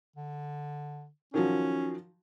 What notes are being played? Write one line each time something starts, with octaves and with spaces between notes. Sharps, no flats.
D3
D#3 F3 F#3 C#4